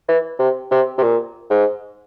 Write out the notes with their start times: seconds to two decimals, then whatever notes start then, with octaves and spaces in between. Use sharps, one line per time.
0.09 E3
0.39 C3
0.71 C3
0.98 C3
1.02 A#2
1.50 G#2